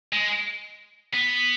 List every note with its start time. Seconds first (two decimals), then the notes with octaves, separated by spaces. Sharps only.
0.13 G#3
1.14 B3